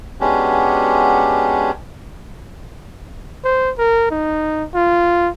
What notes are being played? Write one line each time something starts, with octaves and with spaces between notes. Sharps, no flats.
G#3 B3 C#4 D4 F#4 G4
C5
A#4
D#4
F4